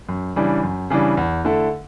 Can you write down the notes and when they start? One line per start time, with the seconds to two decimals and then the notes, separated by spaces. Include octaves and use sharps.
0.09 F#2
0.36 C#3 E3 G3 D4
0.63 F#2
0.90 C#3 E3 G3 D4
1.17 E2
1.44 D3 A3 E4 A4